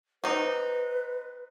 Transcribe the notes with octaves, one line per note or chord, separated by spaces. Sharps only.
C4 D#4 B4